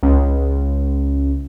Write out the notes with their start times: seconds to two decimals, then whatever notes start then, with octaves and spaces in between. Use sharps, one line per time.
0.03 C#2